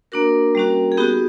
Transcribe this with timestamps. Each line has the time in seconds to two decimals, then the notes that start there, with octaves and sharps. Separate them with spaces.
0.12 A#3 D4 F#4 A#4
0.55 G3 A#3 C#4 F#4
0.92 G#4
0.97 B3 D#4 F#4 G4